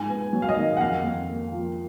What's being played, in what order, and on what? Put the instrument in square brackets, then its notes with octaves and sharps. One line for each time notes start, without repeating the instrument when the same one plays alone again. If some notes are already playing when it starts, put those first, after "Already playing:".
Already playing: [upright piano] G#2 F3 G#5
B3
F#3
F5
D#5
D#3
F#5
F2 F5
F2
A#3
F3